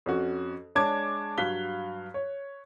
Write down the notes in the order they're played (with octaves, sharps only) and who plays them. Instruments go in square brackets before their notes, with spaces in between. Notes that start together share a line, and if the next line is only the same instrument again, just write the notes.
[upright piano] F2 C#4 F#4
G#3 D4 C#5 A5 D6 G#6
G2 F#3 F5 F#6 B6 G7
C#5